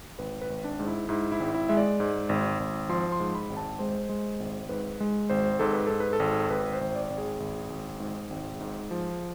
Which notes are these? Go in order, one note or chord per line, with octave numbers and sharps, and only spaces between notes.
G#1 B4
B4
G#1
D4
G#2
E4
G#2 E4
E4
G#1
E4
G#3 E5
D5
G#2
G#1
G#1
F3 C6
C6
G#2
B5
G#1
A5
G#3 C5
G#3
G#1
G#2 B4
G#3
G#1 C5
G#2 A4
B4
G#2 A4
B4
A4
G#1
G#1 B4
C5
G#1
D5
G#1
G#4
G#1
G#1
G#2
G#1
G#2
F3